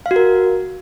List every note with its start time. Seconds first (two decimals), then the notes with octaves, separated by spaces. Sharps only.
0.06 F5
0.11 F#4
0.16 A#4